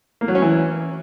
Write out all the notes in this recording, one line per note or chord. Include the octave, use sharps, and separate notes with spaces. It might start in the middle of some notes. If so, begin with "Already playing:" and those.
A#3
F#3
C#4
E3